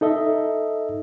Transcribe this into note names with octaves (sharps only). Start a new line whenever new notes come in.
D#4 A4 D#5 E5